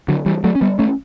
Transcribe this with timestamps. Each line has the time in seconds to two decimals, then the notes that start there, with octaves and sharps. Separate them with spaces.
0.08 D3 F#3
0.26 E3 G3
0.44 F#3 A3
0.55 C#4
0.61 G3 B3
0.79 A3 C#4